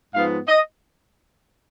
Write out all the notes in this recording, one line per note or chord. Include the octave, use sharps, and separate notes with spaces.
G#2 F3 B3 F5
D#5